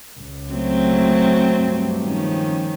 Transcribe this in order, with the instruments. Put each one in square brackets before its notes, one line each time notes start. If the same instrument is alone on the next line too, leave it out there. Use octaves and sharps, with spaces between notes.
[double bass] C#2
[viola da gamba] F#3 A3 C4
[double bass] G2
[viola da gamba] D#3 F3 C#4